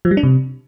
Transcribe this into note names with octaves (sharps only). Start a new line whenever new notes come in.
F3
G3
D4
C3